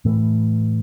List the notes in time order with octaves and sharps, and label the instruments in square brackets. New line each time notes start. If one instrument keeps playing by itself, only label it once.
[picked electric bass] A2 E3 A3